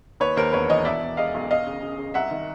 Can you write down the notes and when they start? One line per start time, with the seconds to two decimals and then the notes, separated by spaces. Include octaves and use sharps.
0.20 D#2 B4 C#5
0.37 D#2 A#4 C5
0.53 E1 B4 C#5
0.69 E3 C#5 D#5
0.85 B2 D5 E5
1.01 B2
1.17 G#3 D#5 F5
1.34 B1
1.49 E1 D#5 F5
1.67 C#3
1.83 C#3
1.98 C#3
2.14 C2 E5 F#5
2.31 D#3